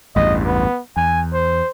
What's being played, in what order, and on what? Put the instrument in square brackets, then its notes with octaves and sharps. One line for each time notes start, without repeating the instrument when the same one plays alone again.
[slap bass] A1 E2 G2 [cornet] D#5
[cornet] B3
[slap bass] E2 [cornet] G#5
[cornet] C5